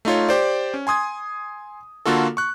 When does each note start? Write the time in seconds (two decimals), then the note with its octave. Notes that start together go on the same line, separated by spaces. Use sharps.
0.05 A3 D#4 F4 C#5
0.29 G4 C5 D5
0.74 C#4
0.87 G#5 C6 D#6 G#6
2.05 D3 A#3 F4 F#4 A4
2.37 C#6 F#6